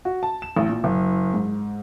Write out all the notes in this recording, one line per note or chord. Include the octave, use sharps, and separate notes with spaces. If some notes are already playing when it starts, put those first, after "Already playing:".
F#4
A5
E7
A1
A#2
F#1
G#2